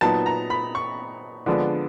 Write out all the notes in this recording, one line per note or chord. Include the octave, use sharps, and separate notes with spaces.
A#2 F#3 B3 D#4 A5
A#5
B5
C#6
D3 F3 G#3 B3 D4